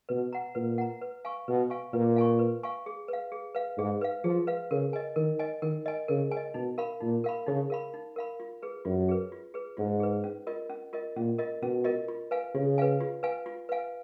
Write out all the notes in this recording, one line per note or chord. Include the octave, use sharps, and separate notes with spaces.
B2 B4
F#5 A#5
A#2 B4
F#5 A#5
B4
F5 G#5 C#6
B2 B4
F5 G#5 C#6
A#2 B4
F5 G#5 C#6
B4
F5 G#5 C#6
G#4
B4 F5
G#4
B4 F5
G#2 G#4
B4 F5
F3 G#4
B4 F5
C#3 A#4
D#5 G#5
D#3 A#4
D#5 G#5
D#3 A#4
D#5 G#5
C#3 A#4
G#5
D#5
B2 D#4
A#4 F5 B5
A#2 D#4
A#4 F5 B5
C#3 D#4
A#4 F5 B5
D#4
A#4 F5 B5
F4
G#4 B4
F#2 F4
G#4 B4
F4
G#4 B4
G#2 F4
G#4 B4
C#4
F4 A#4 D#5
C#4
F4 A#4 D#5
A#2 C#4
F4 A#4 D#5
B2 C#4
F4 A#4 D#5
F4
B4 F5 G#5
C#3 F4
B4 F5 G#5
F4
B4 F5 G#5
F4
B4 F5 G#5